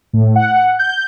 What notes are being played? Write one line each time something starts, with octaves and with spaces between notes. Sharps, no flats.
A2
F#5
G6